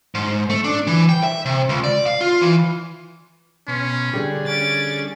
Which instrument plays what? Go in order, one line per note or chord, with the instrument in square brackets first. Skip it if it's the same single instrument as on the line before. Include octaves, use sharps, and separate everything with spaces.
[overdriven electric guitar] G#2
A3
D4
E3
G5
E5
C3
C#2
D5
F5
F4
E3
[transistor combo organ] B2 C6 [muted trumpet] C#4
[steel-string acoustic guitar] D3 G3 [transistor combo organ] D4 G#4
[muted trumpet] C#4 [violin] A6 D7